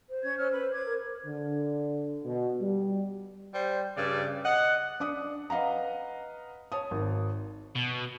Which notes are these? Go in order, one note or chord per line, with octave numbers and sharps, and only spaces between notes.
C5
C#4 C#5 G#6
C#4 E6 F6
B4
D6 G#6
A#4
D3
B2
G3
G3 C5
G2 C#3 D5
D#5 F#5
D4 D6 D#6
B4 D#5 F5 F#5 A#5
C#5 A5 D#6
G#1
B2